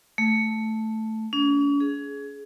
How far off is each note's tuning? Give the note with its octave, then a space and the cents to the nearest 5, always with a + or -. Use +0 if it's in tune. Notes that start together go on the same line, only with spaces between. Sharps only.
A3 +0
C#4 +45
G#4 +20